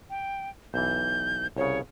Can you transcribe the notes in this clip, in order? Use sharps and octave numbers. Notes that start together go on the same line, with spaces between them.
G5
B1 E3 G6
C2 C#3 C#5